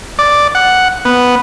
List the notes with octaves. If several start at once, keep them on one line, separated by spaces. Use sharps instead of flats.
D5
F#5
B3